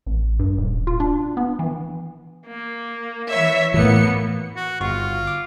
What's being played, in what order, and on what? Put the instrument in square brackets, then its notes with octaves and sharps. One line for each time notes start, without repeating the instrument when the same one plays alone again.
[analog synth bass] A1
G2
D#1
F4
D4
B3
E3
[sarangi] A#3
[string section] E3 E5 [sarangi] C#5
[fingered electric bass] A2 E3 [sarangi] A#3 [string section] B3 C#7
[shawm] F#4
[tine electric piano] G1 F#4 C#6 [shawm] F4
[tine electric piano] D6